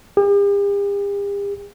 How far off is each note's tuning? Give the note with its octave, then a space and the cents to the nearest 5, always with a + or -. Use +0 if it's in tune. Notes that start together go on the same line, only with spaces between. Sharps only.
G4 +45